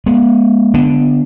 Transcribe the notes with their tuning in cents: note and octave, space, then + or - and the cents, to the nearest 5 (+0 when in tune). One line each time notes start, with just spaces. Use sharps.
G#3 +0 B3 -40
D3 +0 B3 +0 D4 +0